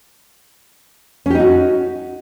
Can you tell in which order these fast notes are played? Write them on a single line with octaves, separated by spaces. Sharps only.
C#4 G4 D#4 F#4